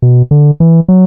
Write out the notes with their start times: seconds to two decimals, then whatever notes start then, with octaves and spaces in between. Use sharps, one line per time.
0.02 B2
0.31 D3
0.60 E3
0.88 F#3